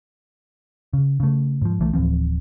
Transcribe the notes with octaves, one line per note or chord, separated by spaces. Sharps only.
C#3
C#3 A3
G#2 F3
B1 E3 A3
D1 E3 F3 C4